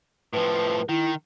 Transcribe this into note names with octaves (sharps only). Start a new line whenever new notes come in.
A2 F3 B4
D#3 E4